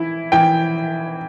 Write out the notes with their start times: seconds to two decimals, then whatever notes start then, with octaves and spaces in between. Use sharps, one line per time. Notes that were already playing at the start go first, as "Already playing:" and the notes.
Already playing: E3 E4
0.32 E3 G5